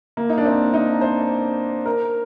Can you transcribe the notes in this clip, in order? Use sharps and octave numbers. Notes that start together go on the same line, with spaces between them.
A#3
D#4
D4
C4
D#4
C5
A#4